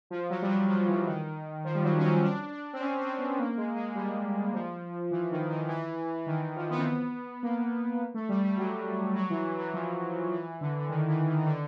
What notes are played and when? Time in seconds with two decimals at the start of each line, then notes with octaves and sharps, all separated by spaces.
0.10 F3
0.30 F#3
0.42 G3
0.49 F#3
0.69 F3
0.88 E3
1.07 D#3
1.64 F3
1.75 G3
1.84 F#3
1.98 C#4
2.03 C4
2.22 D4
2.51 D4
2.73 C4
2.80 C#4
2.99 C4
3.18 B3
3.39 A#3
3.57 G#3
3.76 G#3
3.95 G3
4.53 F3
5.11 E3
5.31 D#3
5.50 D#3
5.69 E3
6.26 D#3
6.41 E3
6.56 F3
6.70 B3
6.78 C4
6.84 B3
7.43 A#3
8.14 A3
8.29 G3
8.44 G3
8.58 F#3
9.16 F#3
9.30 E3
9.59 E3
9.74 F3
10.32 E3
10.61 D3
10.79 D3
10.89 D#3
11.08 E3
11.28 D#3
11.39 D#3
11.47 D3